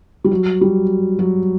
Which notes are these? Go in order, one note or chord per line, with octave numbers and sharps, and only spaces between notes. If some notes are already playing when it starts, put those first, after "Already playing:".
G3
F#3
G3
F#3